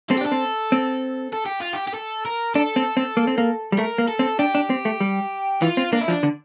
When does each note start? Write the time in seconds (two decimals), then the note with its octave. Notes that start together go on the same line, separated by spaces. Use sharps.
0.10 C4 A4
0.18 G4
0.21 D4 A4
0.32 C4
0.72 C4
1.33 A4
1.46 G4
1.60 F4
1.73 G4
1.87 G4
1.94 A4
2.25 A#4
2.55 D4 A4
2.76 C4
2.97 C4
3.17 A#3
3.27 C4
3.38 A#3
3.72 G3
3.78 A3 A#4
3.98 A#3
4.08 A4
4.19 C4
4.39 D4 G4
4.55 D4
4.70 C4
4.85 A3
5.01 G3
5.62 E3 F4
5.77 C4
5.92 A#3 D4
6.01 E4
6.08 F3 D4
6.23 D3